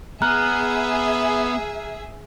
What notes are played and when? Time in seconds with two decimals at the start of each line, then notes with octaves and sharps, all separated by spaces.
0.22 B3 G#4 E5 A#5 F6 F#6